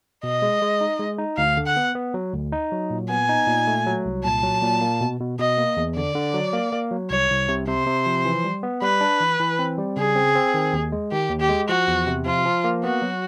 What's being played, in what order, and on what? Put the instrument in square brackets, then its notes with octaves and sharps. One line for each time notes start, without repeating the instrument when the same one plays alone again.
[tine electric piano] B2 [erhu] D#5
[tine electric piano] G#3
G#3
D#4
G#3
D#4
[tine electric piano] D2 [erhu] F5
[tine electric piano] D3
[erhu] F#5
[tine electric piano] B3
B3
F#3
D2
D#4
F#3
A#2
[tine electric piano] B3 [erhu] G#5
[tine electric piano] D#4
A#2
A3
F#3
C2
[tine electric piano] A#2 [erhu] A5
[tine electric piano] F#3
A#2
A#3
B2
B2
[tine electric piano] B2 [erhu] D#5
[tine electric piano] A#3
E2
[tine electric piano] D3 [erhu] D5
[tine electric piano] D3
F#3
A#3
A#3
F#3
[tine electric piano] C2 [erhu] C#5
[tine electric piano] C2
C3
[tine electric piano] C3 [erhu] C5
[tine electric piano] C3
F3
E3
G3
B3
[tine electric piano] G3 [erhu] B4
[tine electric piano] D4
E3
E3
C4
G3
[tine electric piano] C#3 [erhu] G#4
[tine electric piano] C4
C4
D#3
D#2
G#3
[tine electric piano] D#3 [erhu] G4
[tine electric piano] D#2
[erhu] G4
[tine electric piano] G#3
[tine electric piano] F3 [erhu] F#4
[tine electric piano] E2
C3
[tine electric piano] F3 [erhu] F4
[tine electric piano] F3
A#3
[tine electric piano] B3 [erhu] F#4
[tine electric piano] F#3